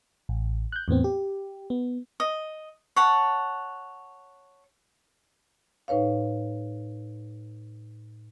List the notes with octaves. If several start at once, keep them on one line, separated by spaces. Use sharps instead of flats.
A1
F#6 G6
E2 A2 B3 C4
G4
B3
D#5
C#5 F#5 A5
A2 D#4 B4 C#5 F5